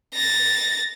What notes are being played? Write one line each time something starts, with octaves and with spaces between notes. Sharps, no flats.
A6 A#6